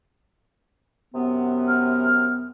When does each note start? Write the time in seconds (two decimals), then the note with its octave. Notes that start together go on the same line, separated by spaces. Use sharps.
1.14 F#2 C3 B3
1.68 F6